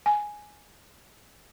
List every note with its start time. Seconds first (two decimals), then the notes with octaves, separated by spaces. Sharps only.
0.06 G#5